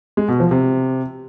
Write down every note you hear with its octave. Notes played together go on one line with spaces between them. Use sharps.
G#3
B2
F3
C3